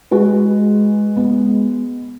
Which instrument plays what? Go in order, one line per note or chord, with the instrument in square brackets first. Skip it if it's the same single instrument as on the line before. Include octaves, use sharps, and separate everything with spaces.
[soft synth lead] G#3 [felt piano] F#4 G#4 B4
[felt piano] B3